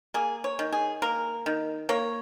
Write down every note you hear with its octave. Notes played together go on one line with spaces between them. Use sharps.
A#3 G#4
C#5
D#3
G#4
A#3 A#4
D#3
A#3 C#5